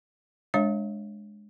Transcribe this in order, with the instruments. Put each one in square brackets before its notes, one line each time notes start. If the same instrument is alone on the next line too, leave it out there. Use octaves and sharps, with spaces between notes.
[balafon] G#3 D4 C#5 F5